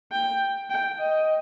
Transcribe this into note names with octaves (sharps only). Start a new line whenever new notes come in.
G5
G5
D#5